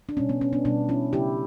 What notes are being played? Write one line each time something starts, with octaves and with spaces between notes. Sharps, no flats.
D4
B2 G3 C#4
B3
C#4
B3 D4
B2 G3 B3 D4
C#4 E4
C#3 F#3 A3 E4 G4